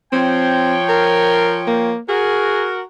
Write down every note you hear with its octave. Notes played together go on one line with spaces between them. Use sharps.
F3 C4 C#5 G5
A#4
A#3
F#4 G#4 A#4